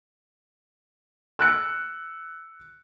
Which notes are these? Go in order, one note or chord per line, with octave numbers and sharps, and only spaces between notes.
E6 F#6 C#7